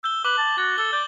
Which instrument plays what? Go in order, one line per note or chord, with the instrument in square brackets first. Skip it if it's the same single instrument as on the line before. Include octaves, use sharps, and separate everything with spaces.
[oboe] E6 [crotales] G6 G7
[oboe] B4 [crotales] D6 F#7
[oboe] A5
[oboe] F#4 [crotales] A6
[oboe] A4 [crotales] G7
[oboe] D5 [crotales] G6